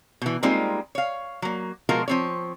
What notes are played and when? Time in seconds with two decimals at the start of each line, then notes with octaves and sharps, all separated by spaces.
0.22 B2 E3
0.43 G3 G#3 A#3 C4 D#4 F4
0.95 C#5 F5
1.42 F#3 A#3
1.89 B2 F3 G#3 F4 F#4 A#4
2.08 F3 C4 C#5